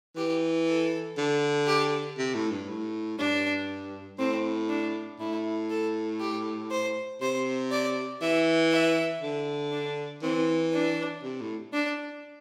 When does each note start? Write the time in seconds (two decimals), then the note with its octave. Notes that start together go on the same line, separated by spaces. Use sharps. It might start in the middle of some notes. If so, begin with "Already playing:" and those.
0.16 E3 G4
0.67 A4
1.18 D3
1.67 G4
2.18 C3
2.35 A2
2.51 G2
2.69 A2
3.18 G2 D4
4.19 A2 C4
4.69 D4
5.20 A2 E4
5.70 A4
6.20 G4
6.71 C5
7.21 C3 C5
7.72 D5
8.21 E3 E5
8.71 E5
9.22 D3
9.73 D4
10.22 E3 C4
10.73 D4
11.23 C3
11.41 A2
11.73 D4